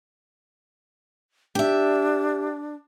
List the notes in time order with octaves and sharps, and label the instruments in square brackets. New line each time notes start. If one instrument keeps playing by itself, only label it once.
[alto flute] D4 [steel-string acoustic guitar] G4 E5